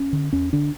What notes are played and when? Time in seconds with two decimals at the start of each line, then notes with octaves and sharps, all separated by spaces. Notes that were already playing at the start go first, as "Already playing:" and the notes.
Already playing: C#4
0.13 D3
0.33 E2 C#4
0.53 D3 D4